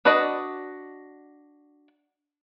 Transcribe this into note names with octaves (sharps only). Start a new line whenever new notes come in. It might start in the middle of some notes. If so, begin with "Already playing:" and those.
D4 F#4 B4 D5 D#5